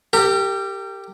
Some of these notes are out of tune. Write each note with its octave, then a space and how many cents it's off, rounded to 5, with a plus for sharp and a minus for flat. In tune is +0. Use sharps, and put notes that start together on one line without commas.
G4 +0 A#4 -40